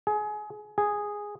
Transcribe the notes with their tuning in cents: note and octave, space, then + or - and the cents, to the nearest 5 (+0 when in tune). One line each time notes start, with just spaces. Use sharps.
G#4 +25
G#4 -5